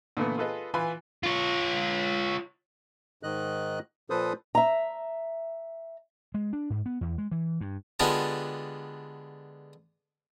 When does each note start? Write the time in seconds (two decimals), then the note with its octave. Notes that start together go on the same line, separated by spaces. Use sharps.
0.17 A#2 D3 E3 A3 B3
0.38 F4 G#4 A4 B4 D#5
0.74 E3 F4 B4 G#5 B5 C6
1.24 F4 C#5
3.23 G#2 D#3 D#5 F#6
4.10 A#2 F3 A4 B4 C5 D#6
4.55 E5 A#5
6.34 G#3
6.53 D4
6.70 G#2
6.86 B3
7.01 E2
7.18 G#3
7.32 E3
7.61 G2
8.00 D3 G#3 B3 D4 F4 G4